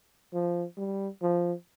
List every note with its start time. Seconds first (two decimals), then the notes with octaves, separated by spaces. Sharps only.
0.33 F3
0.77 G3
1.22 F3